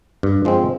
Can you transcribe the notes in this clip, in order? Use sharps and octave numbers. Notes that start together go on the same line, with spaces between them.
G2
F3 G#3 C4